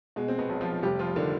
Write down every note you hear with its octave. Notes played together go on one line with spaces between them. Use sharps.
B2 G#3
C4
B2 B3
B1
F3 F4
F1 G3 G4
F3 F4
D3 D#3 D4